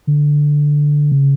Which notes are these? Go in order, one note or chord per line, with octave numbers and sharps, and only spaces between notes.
D3
C#3